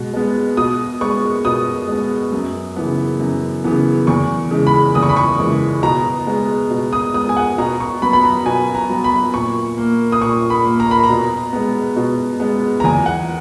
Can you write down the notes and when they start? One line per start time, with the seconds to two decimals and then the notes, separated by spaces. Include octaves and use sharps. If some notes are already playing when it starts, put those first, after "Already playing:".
Already playing: B2 G#3 B3
0.14 G#3 B3
0.57 B2 D#6
1.01 G#3 B3 C#6
1.45 B2 D#6
1.88 G#3 B3
2.32 F#2
2.76 C#3 E3 B3
3.20 F#2
3.64 C#3 E3 B3
4.07 E2 C#6
4.51 C#3 E3 G#3
4.67 B5
4.95 E2 D#6
5.03 C#6
5.09 B5
5.16 C#6
5.39 C#3 E3 G#3
5.83 B2 A#5
6.27 G#3 B3
6.71 B2
6.93 D#6
7.14 G#3 B3 D#6
7.29 G#5
7.37 F#5
7.58 B2 A#5
7.80 C#6
8.02 F#3 B3 B5
8.13 B5
8.24 A#5
8.46 B2 G#5
8.75 A#5
8.90 F#3 B3
9.04 B5
9.34 A#2 C#6
9.78 A#3
10.12 D#6
10.21 A#2 C#6
10.50 B5
10.65 A#3
10.80 A#5
10.91 B5
11.04 A#5
11.09 B2
11.53 G#3 B3
11.96 B2
12.40 G#3 B3
12.80 A#5
12.84 E2 G#5
13.06 F#5